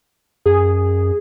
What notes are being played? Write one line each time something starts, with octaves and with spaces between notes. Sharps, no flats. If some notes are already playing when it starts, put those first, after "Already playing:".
F#2 G#4